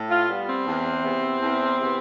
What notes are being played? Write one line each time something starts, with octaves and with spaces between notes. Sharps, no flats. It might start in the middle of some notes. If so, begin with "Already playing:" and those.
Already playing: A2
F4
G3 B3
C4
E2
C3 E3 B3
E2
C3 E3 B3